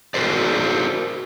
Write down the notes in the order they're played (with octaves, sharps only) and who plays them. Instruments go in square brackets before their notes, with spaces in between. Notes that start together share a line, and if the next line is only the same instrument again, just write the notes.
[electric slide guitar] F#4 A#4 C5 D5